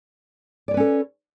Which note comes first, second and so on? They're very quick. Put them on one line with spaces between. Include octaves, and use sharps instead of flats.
D5 C#5 B4 C#4 A4